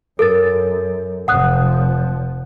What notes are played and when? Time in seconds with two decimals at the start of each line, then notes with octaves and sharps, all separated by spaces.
0.19 F#2 A4 A#4 A6
1.28 F1 F3 F#5 D#6 F#6